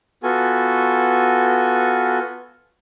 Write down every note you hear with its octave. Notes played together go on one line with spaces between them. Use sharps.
B3 F4 F#4 A4 G#5